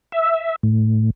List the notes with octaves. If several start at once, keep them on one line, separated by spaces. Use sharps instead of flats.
E5
A2